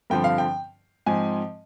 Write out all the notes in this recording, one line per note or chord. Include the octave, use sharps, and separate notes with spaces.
G2 D3 F3 C4 G5
F5
G5
G#2 F3 C4 G#5